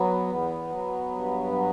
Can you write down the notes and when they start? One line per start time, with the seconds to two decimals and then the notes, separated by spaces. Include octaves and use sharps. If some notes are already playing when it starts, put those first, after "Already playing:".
Already playing: F#3 B3
0.27 E2
0.70 F#3
1.11 G2
1.52 F#3